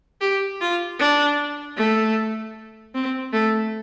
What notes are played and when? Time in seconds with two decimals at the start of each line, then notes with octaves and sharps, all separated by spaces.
0.21 G4
0.61 F4
1.00 D4
1.78 A3
2.95 C4
3.33 A3